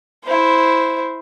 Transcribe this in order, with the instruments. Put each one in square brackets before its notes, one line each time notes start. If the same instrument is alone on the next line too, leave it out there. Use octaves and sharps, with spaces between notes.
[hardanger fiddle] E4 C5